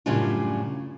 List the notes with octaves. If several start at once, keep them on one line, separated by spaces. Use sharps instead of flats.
F#2 A2 C#3 G3 D4 F4